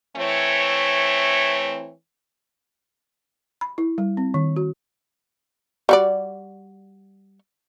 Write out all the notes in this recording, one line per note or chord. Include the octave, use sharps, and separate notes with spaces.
E3 A3 C4 C#5
B5
E4
G3
C4
D#3
F#4
G3 F#4 D5